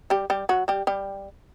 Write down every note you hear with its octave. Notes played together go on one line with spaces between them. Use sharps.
G3 G4
G3 G4
F#3 F#4
G3 G4
G3 G4